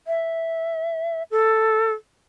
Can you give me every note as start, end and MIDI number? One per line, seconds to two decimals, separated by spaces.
0.07 1.23 76
1.31 1.92 69